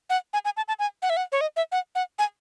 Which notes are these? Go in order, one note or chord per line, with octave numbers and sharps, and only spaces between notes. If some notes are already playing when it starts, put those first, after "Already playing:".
F#5
G#5
G#5
A5
A5
G#5
F#5
E5
F#5
C#5
D#5
E5
F#5
F#5
G#5